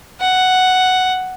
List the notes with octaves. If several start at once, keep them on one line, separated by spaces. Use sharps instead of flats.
F#5